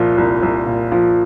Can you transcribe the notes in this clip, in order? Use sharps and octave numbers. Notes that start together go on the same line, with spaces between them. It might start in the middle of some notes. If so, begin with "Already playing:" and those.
Already playing: C2 A#2 F3
C2
C2
A#2
F3